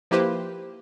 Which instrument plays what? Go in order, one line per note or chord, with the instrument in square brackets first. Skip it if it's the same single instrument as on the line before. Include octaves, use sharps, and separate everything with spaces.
[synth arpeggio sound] F3 A#3 E4 G4 B4 C5